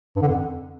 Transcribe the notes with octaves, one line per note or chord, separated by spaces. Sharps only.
G2
D3
F2